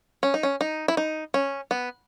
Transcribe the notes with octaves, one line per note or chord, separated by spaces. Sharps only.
C#4
D#4
C#4
D#4
E4
D#4
C#4
B3